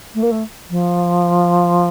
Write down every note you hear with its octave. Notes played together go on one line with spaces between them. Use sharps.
A3
A#3
A3
F3